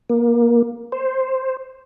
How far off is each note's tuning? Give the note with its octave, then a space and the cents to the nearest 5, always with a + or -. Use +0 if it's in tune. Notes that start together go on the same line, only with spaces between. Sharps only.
A#3 +20
C5 +5